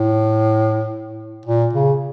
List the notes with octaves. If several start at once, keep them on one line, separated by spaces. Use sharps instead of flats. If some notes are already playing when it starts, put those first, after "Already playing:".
Already playing: A2
A#2
C#3